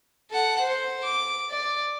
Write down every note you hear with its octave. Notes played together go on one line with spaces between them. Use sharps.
A4 F#5
C5
D6
D5